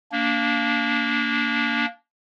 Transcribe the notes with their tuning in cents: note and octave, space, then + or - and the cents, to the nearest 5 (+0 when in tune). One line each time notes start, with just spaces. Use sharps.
A#3 +0 D4 -25